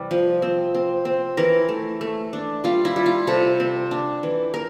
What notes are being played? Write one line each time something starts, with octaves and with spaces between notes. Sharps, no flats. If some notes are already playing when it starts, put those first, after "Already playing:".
Already playing: C3 E3 G3
F3
C4
C4
C4
E3 A#4
A3
A3
D4
G3 F4
E4
G3
F4
C3 A4
C4
D4
E3
A#4